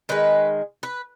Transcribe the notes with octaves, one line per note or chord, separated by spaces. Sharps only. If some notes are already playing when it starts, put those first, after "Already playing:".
D#3 G#3 B4
B4